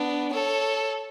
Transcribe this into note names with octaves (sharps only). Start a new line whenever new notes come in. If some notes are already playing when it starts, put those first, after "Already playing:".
Already playing: B3 D4
A4 C#5